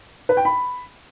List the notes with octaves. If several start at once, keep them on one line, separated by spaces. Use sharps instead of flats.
B4
G5
B5